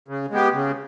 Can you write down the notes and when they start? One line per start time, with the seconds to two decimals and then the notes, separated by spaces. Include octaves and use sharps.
0.08 C#3
0.30 G#3 B3 G4
0.54 C#3